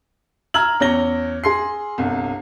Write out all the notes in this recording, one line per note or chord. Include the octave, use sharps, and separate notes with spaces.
A#5 E6 F6 G#6 F#7
E2 C#4 C#5 A#6 G7
G#4 C6 C7
G1 C2